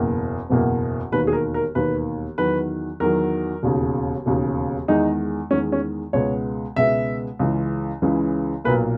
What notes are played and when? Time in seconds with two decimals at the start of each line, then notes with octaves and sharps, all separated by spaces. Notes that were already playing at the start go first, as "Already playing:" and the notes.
Already playing: F#1 E2 B2 A#3
0.50 F#1 E2 B2 A#3
1.12 E1 D#2 D#3 A#3 B4
1.27 G#4
1.33 A#4
1.54 A#4
1.75 E1 D#2 D#3 A#3 B4
2.38 E2 D#3 F#3 B4
3.00 E2 D#3 F#3 A#4
3.63 E1 D#2 C#3
4.26 E1 D#2 C#3
4.88 E2 D#3 G#3 D#4
5.51 E2 D#3 G#3 C#4
5.72 C#4
6.13 C#2 B2 G#3 B3 C#5
6.76 C#2 B2 G#3 B3 E5
7.39 C#2 C#3 E3
8.02 C#2 C#3 E3
8.64 B1 A#2 A#3 B4